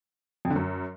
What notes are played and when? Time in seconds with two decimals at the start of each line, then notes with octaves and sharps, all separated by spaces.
0.45 F2
0.50 D3
0.56 F#2